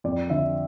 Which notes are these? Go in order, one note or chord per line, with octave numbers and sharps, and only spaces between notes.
F2 D5
D3 E5